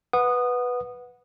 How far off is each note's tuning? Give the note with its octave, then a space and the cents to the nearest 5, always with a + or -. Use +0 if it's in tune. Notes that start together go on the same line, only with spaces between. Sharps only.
B4 +0 F#5 -15 D#6 -20